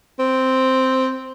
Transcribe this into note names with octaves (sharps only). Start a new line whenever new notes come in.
C4